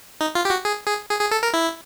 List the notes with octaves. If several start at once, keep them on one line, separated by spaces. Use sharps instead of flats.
D#4
F4
G4
F#4
G#4
G#4
G#4
G#4
A4
A#4
E4